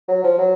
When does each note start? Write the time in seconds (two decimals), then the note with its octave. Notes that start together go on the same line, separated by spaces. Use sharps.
0.08 F#3
0.24 F3
0.38 F#3